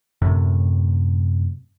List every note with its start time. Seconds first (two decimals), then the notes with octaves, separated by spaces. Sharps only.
0.22 F#2 A2 C3